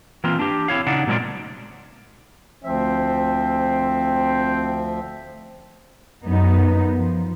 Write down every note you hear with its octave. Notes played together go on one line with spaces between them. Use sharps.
E3 A#3 C4 F4
D4 G4
C4 E4 C#5 F5
C#3 D4 D#4 D5 F#5
A#2 F#3 G#3 C4 F4 D5
D2 F3 C4 E5
F#2 B3 D#4
F3